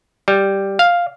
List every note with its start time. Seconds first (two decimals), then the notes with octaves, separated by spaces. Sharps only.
0.28 G3
0.79 F5